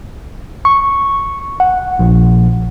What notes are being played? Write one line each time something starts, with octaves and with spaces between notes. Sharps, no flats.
C#6
F#5
A#1